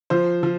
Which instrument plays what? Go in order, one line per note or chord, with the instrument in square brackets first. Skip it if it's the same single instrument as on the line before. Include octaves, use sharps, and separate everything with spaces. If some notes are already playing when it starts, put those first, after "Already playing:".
[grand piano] F3 C5
F3